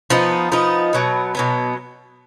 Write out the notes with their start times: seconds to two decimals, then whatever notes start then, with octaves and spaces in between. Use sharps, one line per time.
0.10 F3 B3 D#4
0.52 F3 B3 D#4
0.93 B2 F#3 B3
1.35 B2 F#3 B3